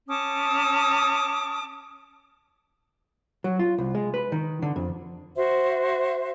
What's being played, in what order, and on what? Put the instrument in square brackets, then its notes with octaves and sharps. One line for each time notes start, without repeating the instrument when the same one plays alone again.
[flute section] C#4 A5 D6 D#6
[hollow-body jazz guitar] F#3
F4
C2
G#3
B4
D#3
D3
F2
[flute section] F#4 C5 E5